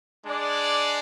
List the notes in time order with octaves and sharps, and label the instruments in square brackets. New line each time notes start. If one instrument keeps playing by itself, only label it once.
[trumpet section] G#3 D4 G#4 D5